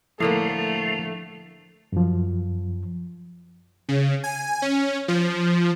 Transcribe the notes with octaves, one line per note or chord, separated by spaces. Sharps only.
A2 D3 F3 A3 A#3
F#2 F3
C#3
G#5
C#4
F3